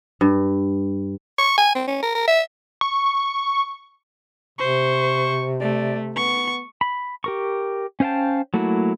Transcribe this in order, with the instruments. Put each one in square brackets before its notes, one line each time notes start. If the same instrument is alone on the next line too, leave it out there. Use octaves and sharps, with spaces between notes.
[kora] G2
[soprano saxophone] C#6
G#5
C4
C#4
A#4
A#4
E5
[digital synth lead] C#6
[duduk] C3 [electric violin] C5 [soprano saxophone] C#6
[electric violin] A3 [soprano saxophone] D5
[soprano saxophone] B3 [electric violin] C#6
[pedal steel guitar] B5
G4 A#4 C#6
C#4 C5 F5 G5 A5
F#3 A3 A#3 E4 F#4